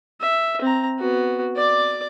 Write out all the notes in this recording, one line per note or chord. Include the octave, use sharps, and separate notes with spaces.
E5
C4 A#5
B3 F#4
D5 D6